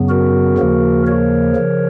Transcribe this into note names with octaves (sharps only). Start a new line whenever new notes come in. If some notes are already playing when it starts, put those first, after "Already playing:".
Already playing: F#2 C#3 F#3 B3
F#4 A#4
D#2 C#3 F3 A#3
A#4 C#5
C#3 F3